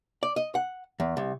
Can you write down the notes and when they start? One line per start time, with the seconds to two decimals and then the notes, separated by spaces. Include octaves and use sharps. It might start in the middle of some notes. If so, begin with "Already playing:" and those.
0.23 D5
0.36 D#5
0.55 F#5
1.00 E2
1.17 C2